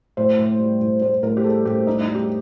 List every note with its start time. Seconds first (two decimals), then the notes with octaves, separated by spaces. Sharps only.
0.17 A2 C5
0.39 A2
0.59 G3
0.81 A2
1.02 A2 C5
1.23 A2 A#4
1.37 G4
1.44 G3 A4
1.65 A2 G4
1.87 G3 D#4
2.01 D#4
2.08 G3
2.15 G4